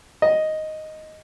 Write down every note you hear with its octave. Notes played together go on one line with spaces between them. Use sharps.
D#5